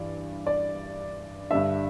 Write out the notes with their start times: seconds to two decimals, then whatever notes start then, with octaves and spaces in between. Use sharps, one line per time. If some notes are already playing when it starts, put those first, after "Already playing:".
Already playing: G2 E3 D5
0.47 D5
1.50 G2 D3 G3 D4 E5